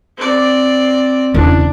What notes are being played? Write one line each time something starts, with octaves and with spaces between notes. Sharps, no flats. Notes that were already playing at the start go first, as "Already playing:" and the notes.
C4 D5
E2 C#3 D4